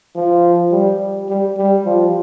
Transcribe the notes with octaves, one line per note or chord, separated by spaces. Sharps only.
F3
G3
G3
G3
F3